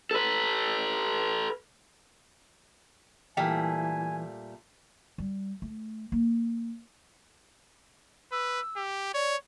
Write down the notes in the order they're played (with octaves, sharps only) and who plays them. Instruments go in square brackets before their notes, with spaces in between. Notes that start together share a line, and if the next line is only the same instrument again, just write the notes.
[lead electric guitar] A4 B4
[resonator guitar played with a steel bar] A#2 G3 A3 [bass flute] E3 [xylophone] G5 [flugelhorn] G#5
[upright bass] G3
A3
A#3
[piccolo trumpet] B4 [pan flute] E6
[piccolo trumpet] G4
[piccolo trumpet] C#5 [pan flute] D5